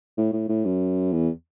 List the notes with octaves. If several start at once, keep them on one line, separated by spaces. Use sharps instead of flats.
A2
A2
A2
F#2
E2